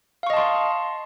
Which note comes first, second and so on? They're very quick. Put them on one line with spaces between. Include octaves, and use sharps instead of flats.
F5 C#6 D#5 A5 C6